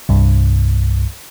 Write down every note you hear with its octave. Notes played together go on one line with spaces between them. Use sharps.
C2 G2